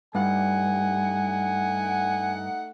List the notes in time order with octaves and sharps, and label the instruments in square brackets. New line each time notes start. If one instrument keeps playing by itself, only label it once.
[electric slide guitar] G2 [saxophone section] A3 D#4 F#5 [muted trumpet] G#5